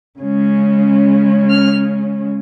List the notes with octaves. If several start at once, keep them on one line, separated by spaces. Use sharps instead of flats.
C#3 G#3 C#4
F6